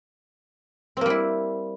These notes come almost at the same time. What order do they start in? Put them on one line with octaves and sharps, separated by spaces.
C4 A#3 G3 E4